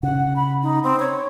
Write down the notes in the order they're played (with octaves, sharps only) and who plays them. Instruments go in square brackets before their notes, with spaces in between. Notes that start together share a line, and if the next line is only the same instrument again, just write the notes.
[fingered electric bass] C#3 [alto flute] F#5
[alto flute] B5
D#4
C4
C#5